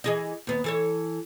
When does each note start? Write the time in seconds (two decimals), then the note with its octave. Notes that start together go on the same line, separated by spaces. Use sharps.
0.04 E3 G#4 D#5
0.47 D#2 B3
0.64 E3 A4 C#5